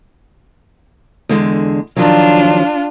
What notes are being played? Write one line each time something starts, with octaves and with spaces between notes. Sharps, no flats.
E2 D3 G#3
D#3 F3 F#3 D4 F4